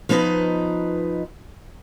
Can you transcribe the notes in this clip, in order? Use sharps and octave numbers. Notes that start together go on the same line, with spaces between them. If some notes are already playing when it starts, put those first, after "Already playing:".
F3 B3 D#4 B4 D#5